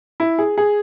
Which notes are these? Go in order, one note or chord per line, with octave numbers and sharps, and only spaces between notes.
E4
G#4
G#4